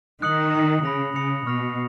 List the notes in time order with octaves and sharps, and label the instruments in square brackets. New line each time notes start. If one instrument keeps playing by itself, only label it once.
[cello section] D#3 [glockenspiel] D#6 F#6 C#7 F#7
[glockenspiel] D#6 F#6 C#7 F#7
[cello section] C#3 [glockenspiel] B5 D#6 A#6 C#7 F7
[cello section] C#3 [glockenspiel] B5 D#6 A#6 C#7 F7
[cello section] B2 [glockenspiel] C#6 F6 A#6 F7